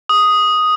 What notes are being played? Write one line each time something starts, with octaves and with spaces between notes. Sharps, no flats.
D#6